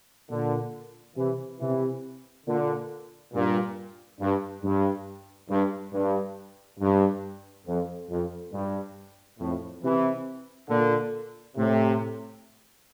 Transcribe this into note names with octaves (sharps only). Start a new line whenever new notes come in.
A#2 D3
C3 E3
C3 E3
A#2 D3
G2 A#2
G2
G2
G2
G2
G2
F2
F2
G2
F2 A2
C3 E3
A#2 D3
A2 C3